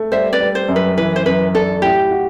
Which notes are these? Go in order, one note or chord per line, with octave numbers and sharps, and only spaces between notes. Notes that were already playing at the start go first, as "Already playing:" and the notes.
Already playing: A3
G3 C5 E5
B4 D5
G3
C5
F#2
B4
E3 B4
C5
F#2 B4
D4 A4
A2 G4
F#4